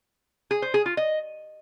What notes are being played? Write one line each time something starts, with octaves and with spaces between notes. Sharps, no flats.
G#4
C5
G#4
F4
D#5